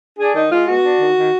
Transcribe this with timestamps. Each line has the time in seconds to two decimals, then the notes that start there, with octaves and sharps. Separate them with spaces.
0.18 D4 G#4
0.35 D#3 D#4
0.52 G#3 F4
0.68 B3 F#4
0.84 D4
1.01 D#3
1.17 D#3